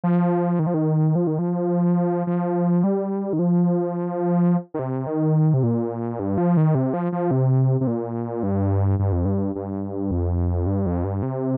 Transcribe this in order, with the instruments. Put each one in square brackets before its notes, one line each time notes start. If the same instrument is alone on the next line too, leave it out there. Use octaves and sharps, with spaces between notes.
[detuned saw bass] F3
D#3
F3
D#3
F3
D#3
F3
F3
G3
D#3
F3
D#3
C3
D#3
C3
A#2
G2
F3
D#3
C3
F3
F3
C3
C3
A#2
G2
G2
F2
G2
G2
F2
G2
F2
G2
C3